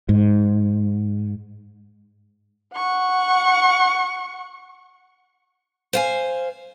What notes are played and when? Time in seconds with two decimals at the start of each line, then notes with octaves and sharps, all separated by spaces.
0.09 G#2
2.74 F#5 C#6
5.93 C5 F5 G#5